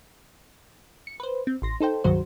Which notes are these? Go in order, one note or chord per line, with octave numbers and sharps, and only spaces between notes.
C#7
B4 C5
C4
A1 C6 A#6
D#4 A4 C5 G5
C#2 G2 D#3 F#3 F#4 C5